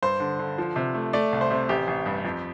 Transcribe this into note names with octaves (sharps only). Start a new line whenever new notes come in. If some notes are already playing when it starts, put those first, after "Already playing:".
G2 C5
D3
D3
F3
C3
A3
A3 D5
C2
C5
C3
A1 G4
A1
G2
F2